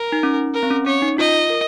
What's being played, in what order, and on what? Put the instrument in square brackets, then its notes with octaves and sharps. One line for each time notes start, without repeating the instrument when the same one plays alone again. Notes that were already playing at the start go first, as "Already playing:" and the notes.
Already playing: [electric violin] A#4
[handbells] D#4
C#4
[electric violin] A#4
[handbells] C4
C#4
[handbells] C#4 [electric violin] C#5
[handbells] D#4
[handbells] F4 [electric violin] D#5
[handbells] A#4